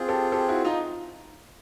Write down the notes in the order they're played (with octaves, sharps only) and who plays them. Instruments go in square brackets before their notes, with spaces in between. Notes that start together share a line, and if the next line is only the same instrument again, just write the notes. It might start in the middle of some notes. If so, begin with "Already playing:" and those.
Already playing: [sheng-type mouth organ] C4 F4 G#4
[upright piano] G4 A4
G4 A4
E4 F#4
D#4 F4